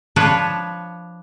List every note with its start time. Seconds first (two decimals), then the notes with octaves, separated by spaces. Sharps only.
0.16 F3 D4 F4 B4 C#5